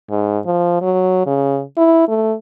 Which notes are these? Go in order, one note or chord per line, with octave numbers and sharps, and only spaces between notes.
G#2
F3
F#3
C#3
E4
A3